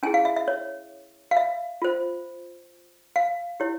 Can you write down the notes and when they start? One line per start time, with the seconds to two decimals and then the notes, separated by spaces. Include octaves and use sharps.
0.03 C#4 E4 G#4 G#5
0.14 F5
0.25 E5
0.37 E5
0.48 C#5
1.31 F5
1.37 E5
1.82 F4 C5
3.16 F5
3.60 E4 G4 C#5